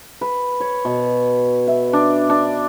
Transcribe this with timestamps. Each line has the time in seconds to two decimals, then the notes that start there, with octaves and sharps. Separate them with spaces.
0.21 B4
0.60 C#5
0.85 B2
1.67 E5
1.93 D4
2.29 D4